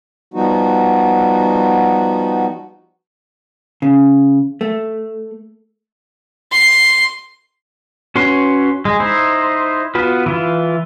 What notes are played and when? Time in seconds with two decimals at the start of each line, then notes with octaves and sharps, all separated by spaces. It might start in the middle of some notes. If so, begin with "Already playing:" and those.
0.34 F3 G3 B3 D#4 F#4
3.82 C#3
4.61 A3
6.52 C6
8.16 C#4 F#4 B4 C#5 C6
8.85 G#3
9.00 D#4 E4 C5
9.95 B3 F4 F#4 B4
10.26 E3 E4 F4